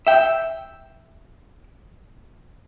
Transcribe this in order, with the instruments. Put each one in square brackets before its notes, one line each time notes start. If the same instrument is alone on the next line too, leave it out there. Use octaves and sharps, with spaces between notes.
[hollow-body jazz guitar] E5 G5